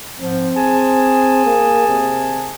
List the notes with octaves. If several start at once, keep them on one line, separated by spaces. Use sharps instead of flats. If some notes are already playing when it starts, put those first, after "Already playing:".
G#2 F3 C4
G#4 G#5 A5
A#3
C3